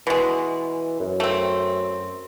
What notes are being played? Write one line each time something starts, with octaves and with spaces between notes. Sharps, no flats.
B2 E3 G#3
F#2
A3 C4